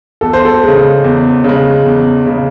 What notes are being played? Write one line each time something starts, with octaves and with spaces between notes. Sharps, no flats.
E2 A4
C5
A4
C#3 G#3
E2
C#3 G#3
E2
C#3 G#3